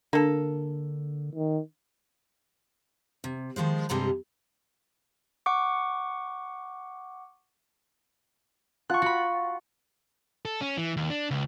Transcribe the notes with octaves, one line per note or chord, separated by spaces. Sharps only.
D3 A#3 D4 A4
D#3
C3
D#3 F3 G#3 C5
G2 C3 G3 G#3 A#5
F#5 C#6 D6
F4 F#5 A5 C#6 F#6
F#4 B5
A4
C#4
E3
D#2
D4
C#2